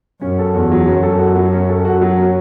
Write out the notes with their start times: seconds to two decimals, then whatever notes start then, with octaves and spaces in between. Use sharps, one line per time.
0.21 F#2 C#4
0.39 A4
0.55 E2 F#4
0.71 F#3
0.87 F#2 C#4
1.03 A4
1.19 F#4
1.35 F#3
1.53 C#4
1.69 A4
1.85 F#4
2.01 F#3
2.17 C#4